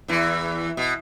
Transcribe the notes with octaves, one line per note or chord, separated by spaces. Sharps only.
E2 E3
B2